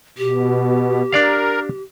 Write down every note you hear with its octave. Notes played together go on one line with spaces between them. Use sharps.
B2 G4
D4 A#4 D5 F5